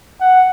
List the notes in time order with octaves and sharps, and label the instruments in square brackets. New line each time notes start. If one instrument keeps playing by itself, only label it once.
[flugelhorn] F#5